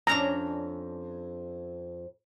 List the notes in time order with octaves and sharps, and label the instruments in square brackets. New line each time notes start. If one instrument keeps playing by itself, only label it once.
[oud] F2 C#4 D4 [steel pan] A#5